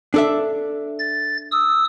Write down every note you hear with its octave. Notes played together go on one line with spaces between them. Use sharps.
D4 A4 E5
A6
D#6 E6